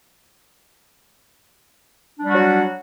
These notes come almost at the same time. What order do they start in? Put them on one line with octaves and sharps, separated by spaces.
D4 G3 F#4 F#3